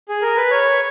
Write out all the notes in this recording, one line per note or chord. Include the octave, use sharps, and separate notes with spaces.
G#4
A#4
B4
C#5